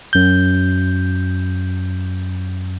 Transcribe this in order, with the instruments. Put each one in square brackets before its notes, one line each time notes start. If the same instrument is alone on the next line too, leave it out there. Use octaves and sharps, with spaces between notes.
[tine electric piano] F#2 G6